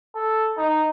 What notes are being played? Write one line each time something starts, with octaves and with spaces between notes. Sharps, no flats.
A4
D#4